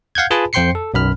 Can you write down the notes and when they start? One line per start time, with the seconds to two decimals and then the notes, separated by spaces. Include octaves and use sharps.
0.15 F5 F#5 G6 G#6
0.31 F4 G#4 B4 G#5 A5 B5
0.53 F2 C5 G5 C6 C7 C#7
0.75 A4
0.94 B1 F#2 B5 F6